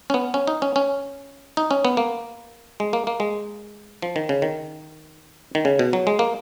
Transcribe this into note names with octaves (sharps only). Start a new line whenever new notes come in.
C#4
B3
C#4
D#4
C#4
C#4
D#4
C#4
B3
A#3
G#3
A#3
A#3
G#3
F3
D#3
C#3
D#3
D#3
C#3
B2
F#3
G#3
A#3